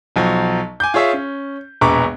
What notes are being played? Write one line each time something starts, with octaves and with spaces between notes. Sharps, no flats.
B1 F3 F#3
G#5 D6 G6
F4 G#4 C#5 E5
C#4
E1 A#1 B4 A#5 C#6 D6